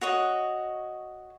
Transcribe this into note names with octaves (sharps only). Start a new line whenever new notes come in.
F#4 C#5 D#5